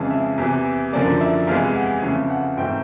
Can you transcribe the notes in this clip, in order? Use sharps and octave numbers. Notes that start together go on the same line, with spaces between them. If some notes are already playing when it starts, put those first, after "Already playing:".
Already playing: F2 C#3 E3 G#3 A5
E5
E2 C3 E3
F#2 D3 F3 A#3 D5
E5
E2 C3 E3 G#3 B3 F5
F#5
F2 C#3 E3 A3
F#5
G#2 E3 A3 C4 G5